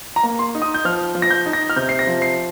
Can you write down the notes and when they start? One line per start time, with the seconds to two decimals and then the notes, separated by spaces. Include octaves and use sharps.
0.16 A#5
0.23 A#3
0.39 C6
0.55 D#4
0.62 D#6
0.74 G6
0.85 F3 F6
1.15 F3
1.22 A#6
1.31 G6
1.46 D#4
1.53 A#6
1.70 F6
1.76 C3 G6
1.89 C7
1.99 A#6
2.07 F3
2.22 C7